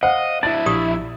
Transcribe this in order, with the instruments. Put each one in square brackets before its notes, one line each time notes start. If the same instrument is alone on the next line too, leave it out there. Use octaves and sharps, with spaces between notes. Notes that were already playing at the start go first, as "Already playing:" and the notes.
[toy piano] C5 [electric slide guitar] D#5 [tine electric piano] F5 [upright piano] F#5
[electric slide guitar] D4 E4 [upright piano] A6
[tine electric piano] A#1 E5 [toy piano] G4 D5 D#6